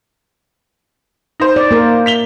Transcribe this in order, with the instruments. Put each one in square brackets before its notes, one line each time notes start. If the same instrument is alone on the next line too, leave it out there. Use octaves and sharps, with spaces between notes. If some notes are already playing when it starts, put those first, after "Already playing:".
[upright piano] D#4 C5
[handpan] D5
A#3 A#4
[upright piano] B6 F7 G7